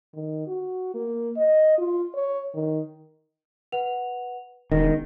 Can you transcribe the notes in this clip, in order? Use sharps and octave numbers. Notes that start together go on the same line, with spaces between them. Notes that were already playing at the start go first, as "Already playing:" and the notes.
D#3
F#4
A#3
D#5
F4
C#5
D#3
B4 F#5 F7
E1 D#3 A#6